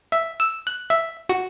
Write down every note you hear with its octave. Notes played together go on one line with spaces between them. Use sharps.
E5
E6
F#6
E5
F#4